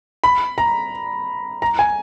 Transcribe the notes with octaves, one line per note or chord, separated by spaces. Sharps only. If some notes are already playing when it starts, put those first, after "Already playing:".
B5
A#5
A#5
G#5